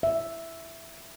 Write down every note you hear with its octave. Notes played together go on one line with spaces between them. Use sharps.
E5